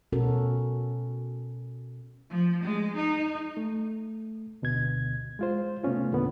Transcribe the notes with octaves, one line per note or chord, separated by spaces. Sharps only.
B2 C#4 F#4 A4 A#4
F3
G#3
D#4
A3
D2 B2 D3 G#6
G#3 F4 C5
C3 A3 B3 C#4 F4
E2 A#2 D3 B3